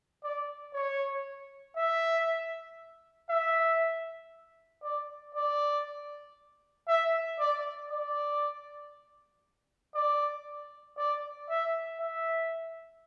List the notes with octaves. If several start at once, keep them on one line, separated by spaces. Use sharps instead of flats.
D5
C#5
E5
E5
D5
D5
E5
D5
D5
D5
D5
E5
E5